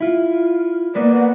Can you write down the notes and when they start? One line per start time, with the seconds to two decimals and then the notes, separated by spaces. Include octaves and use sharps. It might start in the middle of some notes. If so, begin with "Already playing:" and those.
0.01 E4 F4
0.95 A#3 B3 B4 D5
1.15 F#5